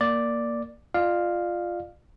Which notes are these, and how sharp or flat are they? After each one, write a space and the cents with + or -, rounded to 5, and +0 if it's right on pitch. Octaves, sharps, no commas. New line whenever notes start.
A#3 +0 D5 +0
F4 +0 D5 +35 F5 +0